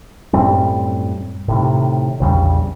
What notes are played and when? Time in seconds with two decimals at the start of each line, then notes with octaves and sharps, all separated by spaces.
0.33 F#2 A2 G3 C4
1.48 A2 C3 D#3
2.20 A#1 E2 C#3 G3